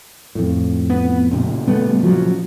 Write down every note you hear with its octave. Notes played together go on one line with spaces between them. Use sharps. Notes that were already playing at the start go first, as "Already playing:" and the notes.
F2 A2
B3
A#2 C#3
G3 A3 B3
F3 F#3